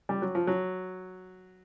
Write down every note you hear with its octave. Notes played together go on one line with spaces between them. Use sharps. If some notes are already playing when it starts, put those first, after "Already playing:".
G3
F#3
F3
F#3